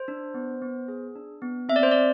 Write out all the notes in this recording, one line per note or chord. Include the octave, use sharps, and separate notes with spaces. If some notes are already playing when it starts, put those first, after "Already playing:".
Already playing: C5
D4
B3
B3
G#4
D4
B3
C4 E5
D5
C5
C4 D5